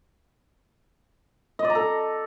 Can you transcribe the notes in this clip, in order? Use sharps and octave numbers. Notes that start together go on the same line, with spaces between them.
D#5
D5
A#5
A4